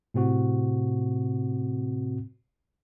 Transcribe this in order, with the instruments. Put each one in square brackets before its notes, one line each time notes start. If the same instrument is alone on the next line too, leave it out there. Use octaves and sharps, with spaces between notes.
[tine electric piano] A2 C3 C4 F#4